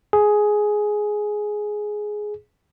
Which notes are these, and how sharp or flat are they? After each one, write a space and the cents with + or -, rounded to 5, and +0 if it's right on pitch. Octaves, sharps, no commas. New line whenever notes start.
G#4 +10